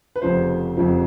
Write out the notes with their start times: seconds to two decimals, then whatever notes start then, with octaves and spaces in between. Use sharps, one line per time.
0.16 B4
0.22 F1 F2 C#3 F3 C5
0.77 F1 F2 C#3 F3